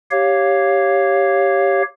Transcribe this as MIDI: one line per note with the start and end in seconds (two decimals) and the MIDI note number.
0.11 1.82 67
0.11 1.82 73
0.11 1.82 77